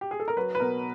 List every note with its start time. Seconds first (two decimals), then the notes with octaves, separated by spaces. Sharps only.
0.01 G4
0.11 G#4
0.20 A4
0.28 A#4
0.37 F#3 B4
0.55 B4
0.60 B2 A#4